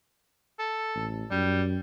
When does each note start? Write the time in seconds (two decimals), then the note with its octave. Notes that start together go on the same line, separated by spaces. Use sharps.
0.59 A4
0.95 A1
1.31 F#2 G3